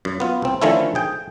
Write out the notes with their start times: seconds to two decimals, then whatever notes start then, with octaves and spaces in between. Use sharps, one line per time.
0.05 F#2
0.20 B3 F4
0.42 C2 C4
0.61 D3 D#3 F3 A3 C#4 E4
0.95 G#4 G5